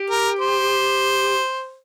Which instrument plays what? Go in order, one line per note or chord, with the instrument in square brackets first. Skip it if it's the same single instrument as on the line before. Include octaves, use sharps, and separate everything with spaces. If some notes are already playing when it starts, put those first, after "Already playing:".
Already playing: [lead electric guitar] G4
[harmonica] A#4
C5